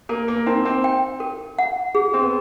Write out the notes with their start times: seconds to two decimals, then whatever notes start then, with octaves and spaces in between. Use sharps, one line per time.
0.09 A#3 A#4
0.28 A#3
0.46 C4 D#4
0.65 C4
0.84 G5
1.20 A#4
1.59 F#5
1.95 G#4
2.14 C4
2.23 B3